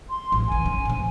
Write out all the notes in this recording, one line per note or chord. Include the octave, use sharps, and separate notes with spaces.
C6
A1 A2
C#3 E3 G#5
C#4
A#2 F3